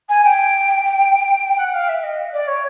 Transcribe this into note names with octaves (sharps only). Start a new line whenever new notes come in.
G#5
G5
F#5
F5
E5
D#5
D5
C#5